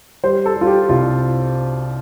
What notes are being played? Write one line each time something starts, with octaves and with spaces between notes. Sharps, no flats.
G3 C5
A4
G3 F4
G4
C2 F4